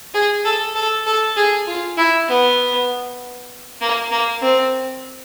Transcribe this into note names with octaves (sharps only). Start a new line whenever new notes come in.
G#4
A4
A4
A4
G#4
F4
E4
B3
A#3
A#3
C4